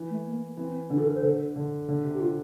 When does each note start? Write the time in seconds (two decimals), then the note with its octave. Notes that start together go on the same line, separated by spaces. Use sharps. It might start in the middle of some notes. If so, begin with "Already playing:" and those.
Already playing: E3
0.10 A3
0.26 A#3
0.57 E3 C4
0.90 D3 D4
0.98 A4
1.06 A#4
1.15 C5
1.23 D3 A4
1.56 D3
1.88 D3
2.04 C3
2.14 G4
2.21 C3 F4